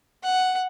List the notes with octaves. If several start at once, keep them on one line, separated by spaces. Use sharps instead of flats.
F#5